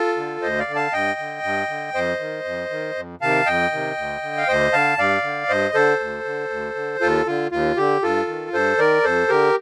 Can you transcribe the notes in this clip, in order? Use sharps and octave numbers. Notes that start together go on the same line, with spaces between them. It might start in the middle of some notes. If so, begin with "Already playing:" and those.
Already playing: F4 A4
D3
D2 C5 D#5
D5 F5
D3
F5 A5
G2 D#5 G5
D3
G2
D3
F2 C5 D#5
D#3
F2
D#3
F2
C3 D#3 F5 A5
F2 D#5 G5
C3 D#3
D2
D3
F5
D2 C5 D#5
D3 F5 A5
G2 D5 F5
D3
G2 C5 D#5
D3 A4 C5
D2
D3
D2
D3
D#2 F4 A4
D3 F4
D#2 F4
D3 G4
G2 F4 A4
D#3
G2 A4 C5
D#3 A#4 D5
F2 A4 C5
D3 G4 A#4